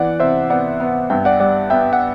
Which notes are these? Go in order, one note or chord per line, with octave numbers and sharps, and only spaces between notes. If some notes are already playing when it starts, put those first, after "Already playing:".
Already playing: E3 B3 D5 F#5
C3 C5 E5
B3 D5 F#5
B3
G2 E5 G5
D5 F#5
G3 D5 F#5
B3 E5 G5
F#5